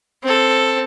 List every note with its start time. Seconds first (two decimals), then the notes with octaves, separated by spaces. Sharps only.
0.23 C4 A4